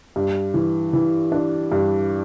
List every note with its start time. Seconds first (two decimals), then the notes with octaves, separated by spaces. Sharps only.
0.16 G2
0.54 E3
0.93 E3
1.32 D4
1.72 G2